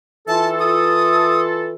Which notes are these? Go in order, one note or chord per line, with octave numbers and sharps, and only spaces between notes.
E3 F4 A4 A5
D#6